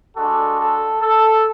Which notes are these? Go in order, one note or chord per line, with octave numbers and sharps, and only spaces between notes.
G#3 D4 F#4 A4
A4
A4